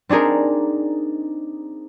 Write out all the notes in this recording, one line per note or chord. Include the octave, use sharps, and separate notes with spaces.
C4 D4 D#4 G#4 A#4